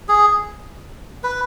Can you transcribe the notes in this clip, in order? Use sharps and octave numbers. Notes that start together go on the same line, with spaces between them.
G#4
B4